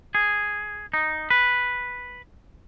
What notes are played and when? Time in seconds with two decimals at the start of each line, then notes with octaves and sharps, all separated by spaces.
0.15 G#4
0.94 D#4
1.30 B4